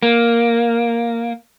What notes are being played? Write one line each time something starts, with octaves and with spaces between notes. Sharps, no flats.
A#3